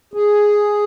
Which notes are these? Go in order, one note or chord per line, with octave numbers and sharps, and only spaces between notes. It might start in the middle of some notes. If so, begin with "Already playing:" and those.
G#4